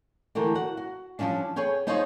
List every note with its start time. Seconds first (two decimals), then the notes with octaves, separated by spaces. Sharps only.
0.35 D3 E3 A3 G4 A#4
0.55 F#4 F#5
0.77 F#4
1.19 F3 G3 A#3 C#4 D4
1.56 G#4 B4 C#5 G5 G#5
1.87 B3 D#4 F4 G#4 C5 C#5